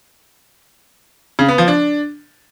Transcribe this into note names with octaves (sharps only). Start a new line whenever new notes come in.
C#3
B3
F3
D4